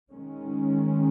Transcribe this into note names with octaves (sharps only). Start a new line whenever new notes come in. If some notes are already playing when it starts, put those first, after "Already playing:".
D#3 G#3 C#4